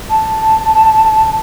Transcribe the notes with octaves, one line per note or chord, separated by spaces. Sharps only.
A5